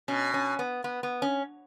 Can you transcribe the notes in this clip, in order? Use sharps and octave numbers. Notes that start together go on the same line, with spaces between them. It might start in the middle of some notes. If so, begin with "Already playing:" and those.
B2 C#4
C#4
B3
B3
B3
C#4